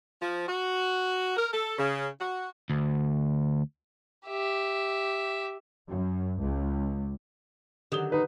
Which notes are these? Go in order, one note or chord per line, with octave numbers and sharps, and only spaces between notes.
F3
F#4
A#4
A4
C#3
F#4
D2
G4 E5
F#2
C#2
D3 D#3 F#3 G4 D#6 G7
D#4 B4